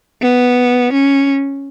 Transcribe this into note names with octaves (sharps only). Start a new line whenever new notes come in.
B3
C#4